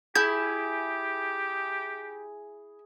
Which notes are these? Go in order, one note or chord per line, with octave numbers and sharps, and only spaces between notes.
E4 G4 G#4 G6